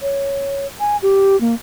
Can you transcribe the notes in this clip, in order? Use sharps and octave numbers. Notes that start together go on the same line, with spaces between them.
C#5
G#5
G4
A#3